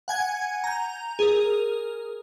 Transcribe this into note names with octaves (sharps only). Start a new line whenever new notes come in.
F#5 G#5 G#6
A#5 G6
G#4 A#4